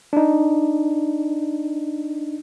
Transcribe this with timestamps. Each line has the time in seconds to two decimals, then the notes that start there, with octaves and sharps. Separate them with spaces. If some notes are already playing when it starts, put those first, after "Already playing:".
0.13 D4 D#4